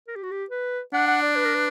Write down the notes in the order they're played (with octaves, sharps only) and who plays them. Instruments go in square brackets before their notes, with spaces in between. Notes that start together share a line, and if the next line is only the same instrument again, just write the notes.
[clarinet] A#4
G4
F#4
G4
B4
[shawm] D4 [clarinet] F#5
[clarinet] F#5
D5
B4
A#4
B4